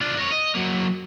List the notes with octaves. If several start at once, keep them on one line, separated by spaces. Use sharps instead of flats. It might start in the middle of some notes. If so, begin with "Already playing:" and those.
D4 F4
A#4 C#5
D#5
F#3 A#3